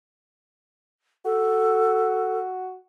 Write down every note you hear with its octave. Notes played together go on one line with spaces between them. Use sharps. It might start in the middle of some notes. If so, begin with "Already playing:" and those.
F#4 A4